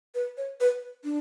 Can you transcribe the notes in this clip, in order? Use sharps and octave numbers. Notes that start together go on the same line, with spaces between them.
B4
C#5
B4
D4